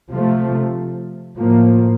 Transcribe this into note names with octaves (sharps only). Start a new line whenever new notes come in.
C3 F3 A3
A2 F3 A#3